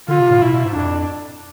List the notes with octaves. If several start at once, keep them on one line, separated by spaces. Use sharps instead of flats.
D3 F4
C3
A2
B2 E4
B2
G#2
F2 D4